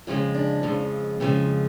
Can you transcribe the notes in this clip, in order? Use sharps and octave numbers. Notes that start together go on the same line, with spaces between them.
F2 C#3 F3 G#3 F4
D4
F2 C#3 F3 G#3
F2 C#3 F3 G#3